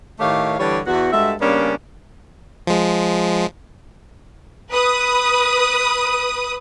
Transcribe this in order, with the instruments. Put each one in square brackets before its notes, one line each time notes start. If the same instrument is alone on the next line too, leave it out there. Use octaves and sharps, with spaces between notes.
[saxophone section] A2 D#3 A3 G4 C#5 F5
D3 E3 G3 D4 C#5 D5
E2 F#4
G2 G#3 F#4 A4 E5
C#3 G3 A#3 B3 C#4 D4
[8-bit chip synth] F3 G#3
[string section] B4 D#6